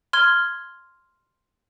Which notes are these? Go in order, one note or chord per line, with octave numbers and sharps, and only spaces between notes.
C6 F6 G#6 G7